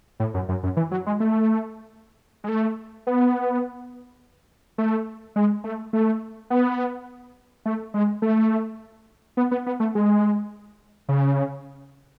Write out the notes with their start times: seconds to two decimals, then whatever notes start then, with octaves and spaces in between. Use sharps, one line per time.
0.20 A2
0.34 F#2
0.49 F#2
0.63 F#2
0.77 E3
0.91 F#3
1.06 G#3
1.20 A3
2.44 G#3
2.49 A3
3.07 B3
4.78 A3
5.36 G#3
5.64 A3
5.93 A3
6.50 B3
7.66 A3
7.94 G#3
8.22 A3
9.37 B3
9.51 B3
9.66 B3
9.80 A3
9.95 G#3
11.09 C#3